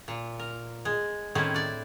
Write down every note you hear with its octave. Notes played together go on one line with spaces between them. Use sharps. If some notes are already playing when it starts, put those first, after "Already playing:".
A#2
A#4
G#3
A2 D#3 C4 C#4 E4
D4 D5